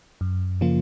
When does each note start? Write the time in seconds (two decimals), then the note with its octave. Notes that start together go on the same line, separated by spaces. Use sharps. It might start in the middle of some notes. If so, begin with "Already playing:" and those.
0.21 F#2
0.61 C#3 F3 A#3 F4